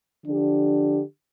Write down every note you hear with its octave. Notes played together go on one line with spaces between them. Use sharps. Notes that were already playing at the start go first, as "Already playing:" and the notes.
D3 F3 D4 G4